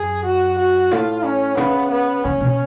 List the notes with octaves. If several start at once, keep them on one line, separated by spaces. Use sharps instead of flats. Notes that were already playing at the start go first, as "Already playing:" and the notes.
Already playing: F#2 G#4
F#4
F#4
A2 F4
C#4
C#3 B3
B3
C#3 C#4
A2
B2